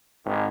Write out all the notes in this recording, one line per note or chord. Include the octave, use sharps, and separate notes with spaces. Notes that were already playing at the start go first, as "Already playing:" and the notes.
G#1